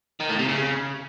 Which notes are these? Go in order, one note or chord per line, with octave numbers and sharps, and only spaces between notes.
D#3
A2
C3
C#3